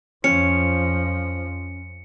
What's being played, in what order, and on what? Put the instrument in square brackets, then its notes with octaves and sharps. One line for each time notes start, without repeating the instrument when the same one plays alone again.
[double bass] F2 F3 [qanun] C#4 [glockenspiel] C#7